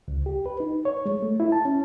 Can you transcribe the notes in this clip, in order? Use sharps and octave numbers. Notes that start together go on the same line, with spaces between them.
C#2
G4
B4
D#4
C#5
G#3
A3
E4
A5
C#4